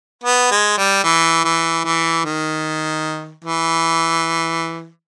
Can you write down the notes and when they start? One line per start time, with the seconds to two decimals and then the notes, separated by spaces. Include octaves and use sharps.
0.24 B3
0.51 G#3
0.78 G3
1.04 E3
1.45 E3
1.84 E3
2.25 D#3
3.45 E3